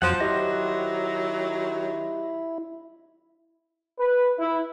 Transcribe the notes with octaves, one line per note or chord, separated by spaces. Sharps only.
F2 F3 F#3 C5 F#5
D#3 F#3 E4 G4 D#5 A#6
B4
E4